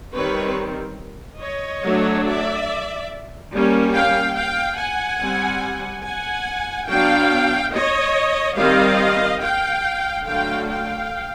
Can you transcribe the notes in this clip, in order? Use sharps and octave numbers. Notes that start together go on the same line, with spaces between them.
D#3 G3 C4 B4 C#5
C#5 D#5
F#3 A3 D4
D5 E5
G3 A#3 C#4
F5 G5
F5 G5
F#5 G#5
G3 C4
F#5 G#5
F#3 B3 D4 F5 G5
C#5 D#5
D#3 G3 C4 D#5 F5
F5 G5
D3 F#3 A3 F5 G5
F5 G5